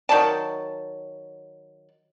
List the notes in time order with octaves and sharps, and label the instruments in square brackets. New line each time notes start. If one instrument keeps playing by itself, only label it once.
[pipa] D#3 F#3 D5 A5